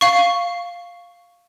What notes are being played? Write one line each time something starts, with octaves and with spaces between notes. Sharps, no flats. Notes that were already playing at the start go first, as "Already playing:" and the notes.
F5 C#6